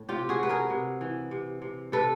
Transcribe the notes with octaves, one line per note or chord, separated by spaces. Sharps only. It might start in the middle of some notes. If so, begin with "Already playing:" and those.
Already playing: A2
C3 F4 G4
F#4 G#4
C3 B4
G#4 A#4
C3
E3
C3
C3
C3 A4 B4